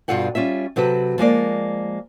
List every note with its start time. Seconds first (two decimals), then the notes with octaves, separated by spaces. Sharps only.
0.08 G2 B2 F4 A4 F#5 G5
0.35 G3 C#4 F4 E5
0.76 C3 F#3 G4 A4 B4
1.18 F3 G#3 A#3 D5